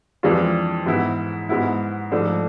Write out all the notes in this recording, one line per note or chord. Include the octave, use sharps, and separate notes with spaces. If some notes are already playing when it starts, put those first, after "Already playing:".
F2 E3 G#3 D4 F4
G#2 E3 B3 E4
G#2 G#3 B3 E4
G#2 F3 A3 D4 A4